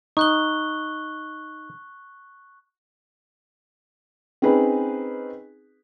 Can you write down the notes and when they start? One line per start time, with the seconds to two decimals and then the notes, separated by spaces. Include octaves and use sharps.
0.17 D#4 C#6 F#6 G7
4.42 C4 C#4 D#4 G#4 B4